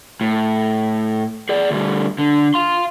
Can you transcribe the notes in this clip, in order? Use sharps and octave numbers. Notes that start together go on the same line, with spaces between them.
A2
G#4 D5
D2 G3
D3
F5 C6